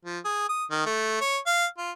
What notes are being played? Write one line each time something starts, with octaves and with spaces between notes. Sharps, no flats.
F3
G#4
D#6
D#3
A3
C#5
F5
F4